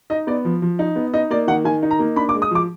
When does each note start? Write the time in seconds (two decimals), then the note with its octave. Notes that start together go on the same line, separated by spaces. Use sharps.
0.10 D#4 D#5
0.27 B3 D5
0.45 F3
0.62 F3
0.79 D#4
0.96 B3
1.14 D#4 D#5
1.31 A#3 D5
1.47 D#3 F#5
1.64 D#3 G#5
1.82 D#4
1.91 A#5
1.99 A#3
2.16 D4 B5
2.29 D6
2.34 G#3
2.42 D#6
2.51 F3 D6